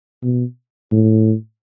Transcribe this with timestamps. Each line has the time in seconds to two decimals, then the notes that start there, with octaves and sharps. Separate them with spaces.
0.23 B2
0.92 A2